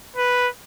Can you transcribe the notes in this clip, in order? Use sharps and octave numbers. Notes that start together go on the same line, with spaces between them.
B4